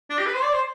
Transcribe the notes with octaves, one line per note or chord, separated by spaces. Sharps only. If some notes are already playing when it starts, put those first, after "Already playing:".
D4
G4
B4
C5
D5
C5